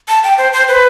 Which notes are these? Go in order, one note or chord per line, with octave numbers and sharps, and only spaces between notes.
A5
G5
C5
C5
B4